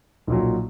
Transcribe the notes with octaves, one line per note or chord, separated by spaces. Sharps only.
B1 A#2 F#3